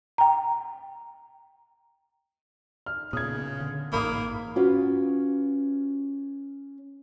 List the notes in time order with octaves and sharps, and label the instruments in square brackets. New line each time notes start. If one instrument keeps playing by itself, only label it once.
[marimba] G5 A#5
[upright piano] F6
[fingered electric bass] A#2 B3 [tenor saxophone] C#3 [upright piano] D#6 G#6
[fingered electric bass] D3
[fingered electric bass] A1 G#2 [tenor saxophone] A#3 [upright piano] B5 D#6
[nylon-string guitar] C#4 F4 F#4 B4